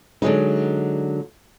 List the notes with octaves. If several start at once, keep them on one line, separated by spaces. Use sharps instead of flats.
D3 F#3 G#3 D#4